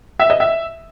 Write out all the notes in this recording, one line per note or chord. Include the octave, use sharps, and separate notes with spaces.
E5
D#5
E5